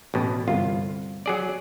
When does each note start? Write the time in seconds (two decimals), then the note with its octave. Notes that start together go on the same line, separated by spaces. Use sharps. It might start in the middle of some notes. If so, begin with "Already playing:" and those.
0.14 A1 B2
0.48 G1 C2 F4
1.26 F#3 G#4 D5